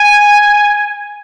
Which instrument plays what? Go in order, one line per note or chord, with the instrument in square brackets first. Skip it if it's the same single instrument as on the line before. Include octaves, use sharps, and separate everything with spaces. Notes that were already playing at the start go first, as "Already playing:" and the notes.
Already playing: [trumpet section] G#5